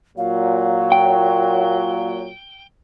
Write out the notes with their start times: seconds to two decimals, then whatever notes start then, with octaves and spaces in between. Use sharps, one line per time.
0.18 A#2 F#3 F5
0.92 G5